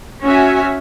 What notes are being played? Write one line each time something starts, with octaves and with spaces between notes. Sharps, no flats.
C#4 F#4 E5 G#5